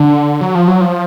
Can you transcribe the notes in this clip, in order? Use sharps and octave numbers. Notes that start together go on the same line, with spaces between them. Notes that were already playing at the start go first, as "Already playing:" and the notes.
Already playing: D3
F#3
F3
F#3
F3